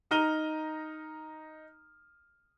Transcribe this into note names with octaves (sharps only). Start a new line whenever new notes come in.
D#4 A#5 F6 D#7 G7